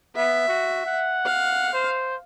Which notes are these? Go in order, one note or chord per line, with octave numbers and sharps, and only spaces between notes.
B3 E5
F#4
F#5
F5
C5